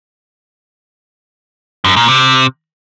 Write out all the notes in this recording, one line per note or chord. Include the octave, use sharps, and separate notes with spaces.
F#2
A#2
C3